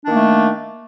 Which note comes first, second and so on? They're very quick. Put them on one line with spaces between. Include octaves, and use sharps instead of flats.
D4 D#3 A#3 A3